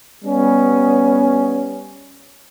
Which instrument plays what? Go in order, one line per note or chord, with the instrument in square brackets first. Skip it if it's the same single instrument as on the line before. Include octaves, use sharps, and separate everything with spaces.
[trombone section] G3 B3 C#4